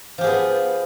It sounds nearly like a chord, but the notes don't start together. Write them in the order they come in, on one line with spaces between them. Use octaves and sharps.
F3 G4 G#4 B3